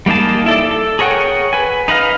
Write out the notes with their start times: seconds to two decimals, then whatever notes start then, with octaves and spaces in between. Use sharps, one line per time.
0.06 G3 A#3 D#4 G#4 A5
0.46 E4 A4 D5
0.71 A4
0.99 G#4 A#4 C#5 F#5 G5
1.53 B4 G#5
1.88 D#4 B4 D#5 F5